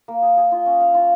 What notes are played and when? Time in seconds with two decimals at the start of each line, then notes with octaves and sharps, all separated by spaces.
0.08 A#3
0.22 G#4
0.37 G#4
0.52 F4
0.66 C#4
0.80 F5
0.94 F4